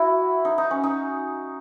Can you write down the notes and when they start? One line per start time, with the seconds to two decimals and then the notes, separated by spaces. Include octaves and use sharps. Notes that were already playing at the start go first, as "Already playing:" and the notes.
Already playing: E4 F#4
0.45 D#4
0.58 D#4
0.71 C#4
0.83 D#4